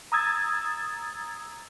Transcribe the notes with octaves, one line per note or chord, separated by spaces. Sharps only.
A#5 D#6 E6 G#6 A6